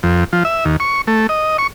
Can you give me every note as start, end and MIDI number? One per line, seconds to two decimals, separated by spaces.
0.03 0.24 41
0.33 0.43 53
0.45 0.65 76
0.65 0.76 39
0.80 1.02 85
1.07 1.27 57
1.29 1.57 75
1.58 1.67 85